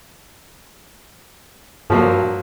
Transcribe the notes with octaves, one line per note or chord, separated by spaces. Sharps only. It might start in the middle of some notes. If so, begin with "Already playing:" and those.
G2 F3 F#3 A#3